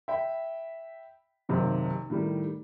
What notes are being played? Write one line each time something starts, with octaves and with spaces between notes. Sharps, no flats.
E5 G5 B5
F#1 B1 C3 D#3
A2 D#3 G3